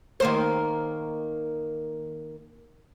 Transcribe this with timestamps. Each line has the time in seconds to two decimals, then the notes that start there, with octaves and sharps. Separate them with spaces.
0.20 D#3 A#3 C5